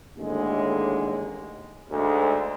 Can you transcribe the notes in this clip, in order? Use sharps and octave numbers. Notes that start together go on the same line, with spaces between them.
A1 D#2 D3 G#3
D2 G#2